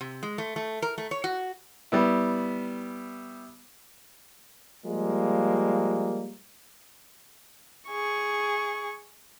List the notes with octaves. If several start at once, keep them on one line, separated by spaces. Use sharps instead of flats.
C3
G#3
A3
A3
A#4
A3
C#5
F#4
G3 B3 E4
F3 G3 G#3 A#3
G#4 C#6